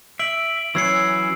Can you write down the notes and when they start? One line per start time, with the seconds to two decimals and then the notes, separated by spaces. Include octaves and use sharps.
0.19 E5 B6 D7 F#7
0.75 E3 F#3 C#4 E6 C7 C#7